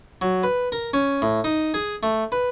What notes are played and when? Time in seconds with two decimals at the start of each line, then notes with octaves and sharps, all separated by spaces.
0.22 F#3
0.43 B4
0.72 A#4
0.94 C#4
1.22 A2
1.44 D#4
1.74 G#4
2.03 A3
2.32 B4